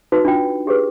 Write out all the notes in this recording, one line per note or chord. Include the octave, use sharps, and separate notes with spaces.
D#4 F#4 B4
D4 F4 G5
G4 G#4 B4